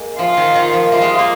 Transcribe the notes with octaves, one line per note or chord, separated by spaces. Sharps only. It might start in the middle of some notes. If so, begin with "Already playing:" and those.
Already playing: G#3 A#3
F3 F4
D#3
D#3
F3
G3 F4
G#3
A#3